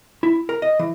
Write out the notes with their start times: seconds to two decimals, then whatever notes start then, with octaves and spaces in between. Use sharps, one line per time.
0.23 E4
0.49 A#4
0.62 D#5
0.79 E3